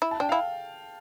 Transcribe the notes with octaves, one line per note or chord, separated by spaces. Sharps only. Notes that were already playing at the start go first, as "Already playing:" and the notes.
E4
A5
D4 G5
E4 F5